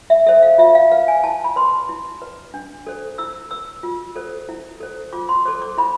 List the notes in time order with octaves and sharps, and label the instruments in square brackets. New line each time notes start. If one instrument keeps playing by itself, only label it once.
[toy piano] E5
A4 C5 E5
F5
F4 E5
F5
B4 F5
G#5
E4 A5
B5
B4 C6
E4
B4
D4
A4 C5
E4 E6
B4 E6
F4
A4 C5
E4
A4 C5
F4 D6
C6
A4 C5 D6
D6
E4 B5